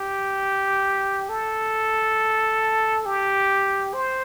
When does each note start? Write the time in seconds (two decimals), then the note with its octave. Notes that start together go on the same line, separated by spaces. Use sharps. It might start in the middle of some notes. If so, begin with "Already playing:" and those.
Already playing: G4
1.29 A4
3.06 G4
3.94 C5